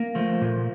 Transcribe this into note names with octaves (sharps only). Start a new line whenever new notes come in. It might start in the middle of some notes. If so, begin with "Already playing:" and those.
Already playing: A#3
F3 A3
A#2